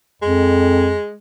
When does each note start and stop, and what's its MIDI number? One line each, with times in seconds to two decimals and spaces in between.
0.22 0.95 41
0.22 1.14 56